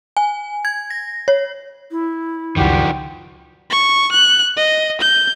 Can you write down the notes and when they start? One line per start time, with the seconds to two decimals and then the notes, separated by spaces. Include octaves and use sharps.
0.17 G#5
0.65 G#6
0.90 A#6
1.28 C#5
1.91 E4
2.56 C#2 F#2 D#3 F3 D4 F#4 G4
3.70 C#6
4.12 F#6
4.57 D#5
5.01 G6